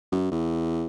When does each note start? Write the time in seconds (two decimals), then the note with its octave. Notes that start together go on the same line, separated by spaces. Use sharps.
0.12 F#2
0.31 E2